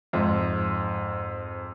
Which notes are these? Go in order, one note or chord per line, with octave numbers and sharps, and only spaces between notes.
F2 G#2